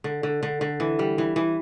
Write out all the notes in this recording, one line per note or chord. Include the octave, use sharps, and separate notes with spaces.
D3
D3
D3
D3
E3
G3
E3
E3